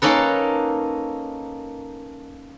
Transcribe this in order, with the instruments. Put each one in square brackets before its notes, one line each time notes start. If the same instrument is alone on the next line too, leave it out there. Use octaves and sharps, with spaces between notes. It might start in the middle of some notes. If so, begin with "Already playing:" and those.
[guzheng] A#3 C#4 D#4 A4 B4